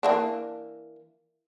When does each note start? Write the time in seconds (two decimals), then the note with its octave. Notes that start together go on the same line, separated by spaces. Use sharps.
0.03 E3 A#3 D4